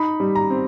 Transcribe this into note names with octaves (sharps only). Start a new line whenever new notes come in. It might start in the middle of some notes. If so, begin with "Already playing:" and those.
Already playing: D#4 B5
G3
A#5
C4